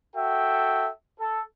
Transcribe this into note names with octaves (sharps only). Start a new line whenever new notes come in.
F#4 A4 E5 G5
A4